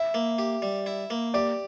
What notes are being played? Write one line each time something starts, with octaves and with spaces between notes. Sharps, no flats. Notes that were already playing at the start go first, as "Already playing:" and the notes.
Already playing: E4 E5
A#3
G4
G3
E4
A#3
G4 D5